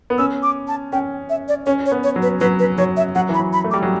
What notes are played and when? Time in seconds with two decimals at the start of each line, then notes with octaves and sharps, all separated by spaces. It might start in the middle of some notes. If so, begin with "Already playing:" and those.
0.10 B3
0.18 C#4 E6
0.43 D6
0.68 A5
0.92 C#4 G5
1.30 E5
1.48 D5
1.66 C#4 C#5
1.86 C#5
1.91 B3
2.04 C#5
2.16 F#3
2.22 B4
2.40 F#3 B4
2.59 B4
2.78 F#3 C#5
2.97 E5
3.15 F#3 F#5
3.29 E3 B5
3.39 F#3
3.53 B5
3.64 A3
3.71 D6
3.74 G3
3.83 F#3